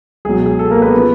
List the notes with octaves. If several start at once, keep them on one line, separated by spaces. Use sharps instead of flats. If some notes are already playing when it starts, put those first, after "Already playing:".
C#2 B2 F#3 G#4
G#4
A4
A#3 A#4
B3 B4
C#3 F3